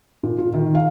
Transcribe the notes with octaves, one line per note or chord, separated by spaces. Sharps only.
A#2
F4
D#3
F5